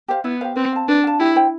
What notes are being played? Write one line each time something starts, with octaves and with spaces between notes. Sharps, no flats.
G4 C5 F5
B3 E4
G4 C5 F5
C4 B4
F5 A5
D4 B4
F5 A5
E4 G4
C5 G5